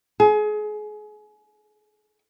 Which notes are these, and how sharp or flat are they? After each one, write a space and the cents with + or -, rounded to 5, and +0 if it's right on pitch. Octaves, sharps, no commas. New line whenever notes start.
G#4 +30